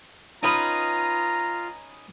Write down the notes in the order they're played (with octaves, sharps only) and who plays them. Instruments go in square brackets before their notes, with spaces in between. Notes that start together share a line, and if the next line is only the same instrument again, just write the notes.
[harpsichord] C#4 D#4 B4 [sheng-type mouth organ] F4 [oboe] A#5